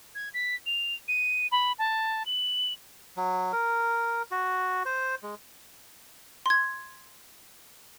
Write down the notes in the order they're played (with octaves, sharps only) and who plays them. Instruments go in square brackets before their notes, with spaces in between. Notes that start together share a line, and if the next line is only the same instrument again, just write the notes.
[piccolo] G#6
B6
F7
D#7
B5
A5
F#7
[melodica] F#3
A#4
F#4
C5
G#3
[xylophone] C6 G#6